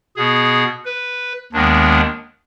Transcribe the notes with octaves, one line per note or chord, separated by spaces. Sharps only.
B2 B3 G#4
B4
D#2 D#3 G#3 B3 D4